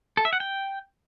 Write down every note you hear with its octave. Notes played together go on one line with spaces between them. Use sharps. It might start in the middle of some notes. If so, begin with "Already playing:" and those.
A4
E5
F#5
G5